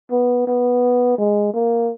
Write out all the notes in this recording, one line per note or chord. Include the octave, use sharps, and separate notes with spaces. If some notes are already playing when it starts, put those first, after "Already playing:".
B3
B3
G#3
A#3